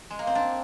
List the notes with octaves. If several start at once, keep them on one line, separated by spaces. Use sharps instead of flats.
G#3
A#3
C4
D4